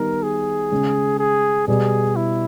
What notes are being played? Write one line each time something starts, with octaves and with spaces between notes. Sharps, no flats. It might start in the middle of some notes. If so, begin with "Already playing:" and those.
Already playing: D#3 G3 B3 D#4 A#4
G#4
C#3 G#3 C#4
G#4
B2 G3 B3 G#4
E4